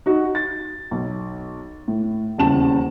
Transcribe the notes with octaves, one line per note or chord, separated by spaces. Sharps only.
D#4 F#4
A6
B1
A2
D#1 E2 C#3 A5 E7